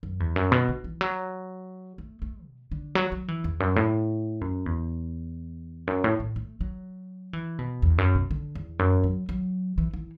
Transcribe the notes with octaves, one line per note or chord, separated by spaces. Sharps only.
F#2
E2
F#2
B2
D3
E3
F#3
A3
A3
B2
D3
F#3
F#3
E3
E2
F#2
A2
F#2
E2
F#2
A2
A2
A3
F#3
E3
B2
E2
F#2
B2
D3
E2
F#2
F#3
F#3
E3
E3